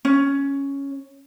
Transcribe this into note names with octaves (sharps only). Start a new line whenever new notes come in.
C#4